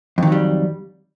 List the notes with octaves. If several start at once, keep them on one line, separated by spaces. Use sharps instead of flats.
F2 D#3 F#3 G3